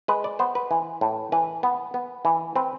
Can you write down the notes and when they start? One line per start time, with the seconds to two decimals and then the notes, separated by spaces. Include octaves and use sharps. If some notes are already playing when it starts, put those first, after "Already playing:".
0.08 G#3 B4
0.24 D5
0.39 B3 C5
0.55 B4
0.71 E3
1.01 A2
1.32 E3 B4
1.63 B3
1.94 B3
2.25 E3
2.56 C4 B4